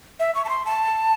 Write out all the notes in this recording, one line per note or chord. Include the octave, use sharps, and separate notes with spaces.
E5
C#6
A5
C6
A5